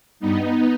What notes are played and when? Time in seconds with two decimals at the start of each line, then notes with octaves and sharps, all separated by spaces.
0.20 G2 G3 B3 D#4